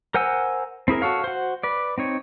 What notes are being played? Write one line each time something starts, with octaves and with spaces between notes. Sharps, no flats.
A#4 C5 F#5 G#5 E6
C4 E4 G#4 A#4
F#4 A4 C#5 F5
F#4 C5
B4 D5
C4 D#4 C#5